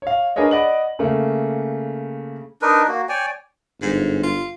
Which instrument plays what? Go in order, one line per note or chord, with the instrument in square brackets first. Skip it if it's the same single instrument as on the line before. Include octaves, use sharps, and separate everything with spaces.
[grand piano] C#5 F5
D4 G#4 A#4 B4 C#5 D#5
D5 D#5 F#5 B5 F#7
C#3 A3 A#3
[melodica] D4 D#4 A#4 B4
A#3 F#4
C#5 D5 G5 G#5
[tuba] G1 [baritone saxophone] G#2
[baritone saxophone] F4